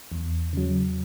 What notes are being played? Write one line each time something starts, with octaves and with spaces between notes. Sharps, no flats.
E2
C#3 F#3